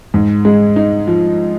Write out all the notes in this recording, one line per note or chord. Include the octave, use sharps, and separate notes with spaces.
G#2
G#3
D#4
F3